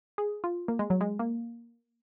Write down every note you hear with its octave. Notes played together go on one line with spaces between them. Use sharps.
G#4
F4
A#3
G#3
F#3
G#3
A#3